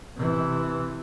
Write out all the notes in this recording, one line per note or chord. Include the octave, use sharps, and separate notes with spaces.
C3 E3